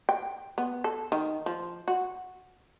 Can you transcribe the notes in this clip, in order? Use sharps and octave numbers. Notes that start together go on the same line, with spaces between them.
G5
B3
A4
D#3
F3
F#4